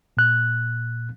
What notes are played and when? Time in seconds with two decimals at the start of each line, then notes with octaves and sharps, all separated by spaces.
0.17 A#2 F#6